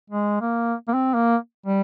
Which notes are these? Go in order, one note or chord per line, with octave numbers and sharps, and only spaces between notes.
G#3
A#3
A#3
C4
A#3
G3